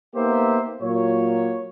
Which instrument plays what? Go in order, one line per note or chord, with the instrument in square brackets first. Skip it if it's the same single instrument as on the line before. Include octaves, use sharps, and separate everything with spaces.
[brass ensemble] A#3 B3 D#4 G4 C5 E5
A#2 F#3 A#3 C#5